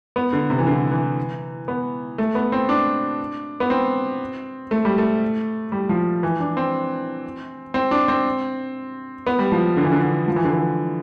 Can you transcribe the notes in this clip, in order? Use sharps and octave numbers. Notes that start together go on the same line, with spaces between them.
B3
D3
C3
E3
D3
E3
B3
A3
B3
C4
D4
B3
C4
A3
G3
A3
G3
F3
E3
D4
C4
C4
D4
C4
B3
G3
F3
D3
E3
D3
D3
F3
E3
D3
E3